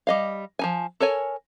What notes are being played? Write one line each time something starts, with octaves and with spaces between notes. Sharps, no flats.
G3 D#5 F5
F3 D#4 G#5
A4 A#4 C#5 G#5